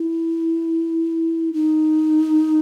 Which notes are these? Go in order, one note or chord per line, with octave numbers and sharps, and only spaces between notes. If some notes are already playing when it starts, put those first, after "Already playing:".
Already playing: E4
D#4